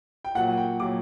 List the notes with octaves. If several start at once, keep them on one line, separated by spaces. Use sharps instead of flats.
G5
A#2 F#3 F#5
G5
A#2 F#3 D6